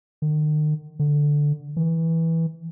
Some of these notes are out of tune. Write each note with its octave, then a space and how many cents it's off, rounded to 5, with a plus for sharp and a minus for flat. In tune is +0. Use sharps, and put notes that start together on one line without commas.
D#3 -40
D3 +0
E3 -10